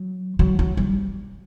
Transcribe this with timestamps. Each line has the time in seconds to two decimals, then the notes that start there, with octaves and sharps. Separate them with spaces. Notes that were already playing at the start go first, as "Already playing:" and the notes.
Already playing: F#3
0.39 F#3
0.59 F#3
0.77 G3